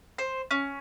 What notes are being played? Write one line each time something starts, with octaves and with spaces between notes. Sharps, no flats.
C5
C#4